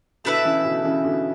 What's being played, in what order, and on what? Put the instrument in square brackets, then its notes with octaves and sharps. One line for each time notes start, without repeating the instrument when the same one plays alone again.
[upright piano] B2 D3 [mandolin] A3 E4 B4 E5
[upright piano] C#3 E3
B2 D3
C#3 E3
B2 D3